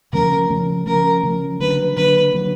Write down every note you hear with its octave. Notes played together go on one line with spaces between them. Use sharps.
C#3 F3 A3 C#4 A#4
C#3 F3 A3 C#4
C#3 F3 A3 C#4 A#4
C#3 F3 A3 C#4
D3 F#3 A#3 D4 B4
D3 F#3 A#3 D4 B4
D3 F#3 A#3 D4